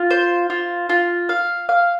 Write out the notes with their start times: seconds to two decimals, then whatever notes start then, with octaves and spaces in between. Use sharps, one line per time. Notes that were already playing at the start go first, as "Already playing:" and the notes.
Already playing: F4
0.10 C5
0.50 F4
0.89 F4
1.29 F5
1.69 F5